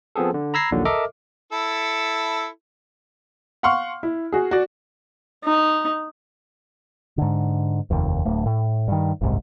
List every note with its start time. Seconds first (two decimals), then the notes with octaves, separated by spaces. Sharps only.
0.16 F3 B3 C4 G#4 A4
0.34 D3
0.54 A#5 B5 E6 G#6 A#6 C7
0.71 A#1 D#2 A#2 D3 D#3 F#3
0.85 A4 A#4 D#5 E5 D6 F6
1.52 E4 A4
3.63 F5 F#5 C6 C#6 F6
4.03 E4
4.32 F#4 G#4
4.51 F#4 D5
5.44 D#4
7.18 G#2 D3
7.90 F1 D#2
8.25 D1 A3
8.46 A2
8.88 G2 D#3
9.21 F#1 C2 G#2